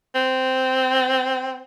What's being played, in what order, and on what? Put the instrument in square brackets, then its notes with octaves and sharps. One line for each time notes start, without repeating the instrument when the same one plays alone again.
[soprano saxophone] C4